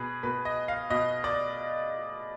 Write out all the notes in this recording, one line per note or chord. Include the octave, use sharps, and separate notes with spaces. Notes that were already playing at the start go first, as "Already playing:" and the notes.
Already playing: B2 G#4 B4
B2 B4
D#5
F5
B2 D#5
D5